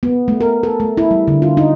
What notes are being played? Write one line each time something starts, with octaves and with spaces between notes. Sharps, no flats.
B3
A3
A#4
A4
A3
E4
G3
D3
F4
D#4